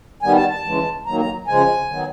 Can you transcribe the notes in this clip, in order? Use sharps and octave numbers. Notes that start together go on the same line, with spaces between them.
D#3 G3 B3 G#5
A5
A5
C#3 E3 G#3
D#3 F#3 A#3 A#5
A#5
C#3 F3 G#3 G#5
D#3 F#3 B3